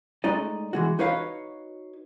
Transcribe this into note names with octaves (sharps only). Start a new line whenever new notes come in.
G#3 A3 D#4 D5 D#5
E3 G#3 F#4
D#4 F#4 B4 C#5 D#5 F5